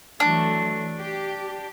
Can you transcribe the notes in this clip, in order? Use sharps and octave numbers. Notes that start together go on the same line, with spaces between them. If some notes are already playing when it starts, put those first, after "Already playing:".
E3 F#3 A3 D4
G4